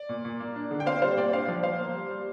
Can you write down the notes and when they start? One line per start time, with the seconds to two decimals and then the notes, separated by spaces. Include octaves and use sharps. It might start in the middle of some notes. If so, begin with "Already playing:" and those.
Already playing: D5
0.09 A#2
0.25 A#2
0.40 A#3
0.56 D4
0.71 D3
0.80 G5
0.86 C4 C5 F5
1.02 G3 C5 F5
1.17 A#2 D5 G5
1.33 D4 C5 F5
1.48 F3 D5
1.63 F3 C5 F5
1.79 A#3
1.94 G3
2.10 G3